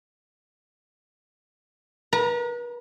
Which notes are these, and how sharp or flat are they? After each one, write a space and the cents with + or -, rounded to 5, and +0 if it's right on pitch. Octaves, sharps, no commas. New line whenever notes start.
B4 -40 A#5 +0